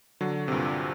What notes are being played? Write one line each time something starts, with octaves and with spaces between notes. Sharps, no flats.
D3 F#3
C3
G2 A#2